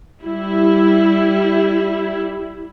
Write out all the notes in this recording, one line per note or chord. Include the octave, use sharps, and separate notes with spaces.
G3 E4